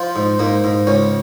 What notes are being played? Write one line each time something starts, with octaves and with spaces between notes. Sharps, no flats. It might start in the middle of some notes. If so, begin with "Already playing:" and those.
Already playing: F3 F4
G#2
G#2 A#3
G#2
C#2 C#4